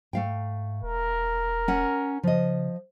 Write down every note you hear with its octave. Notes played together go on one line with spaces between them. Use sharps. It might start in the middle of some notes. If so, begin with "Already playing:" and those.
G#2 A3 F5 G5
E1 A#4
C#4 F#5
C#3 F3 D#5